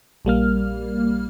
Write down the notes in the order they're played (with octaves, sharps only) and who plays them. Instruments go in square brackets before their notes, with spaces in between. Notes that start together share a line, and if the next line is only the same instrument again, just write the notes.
[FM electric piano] A#1 G3 A#3 F6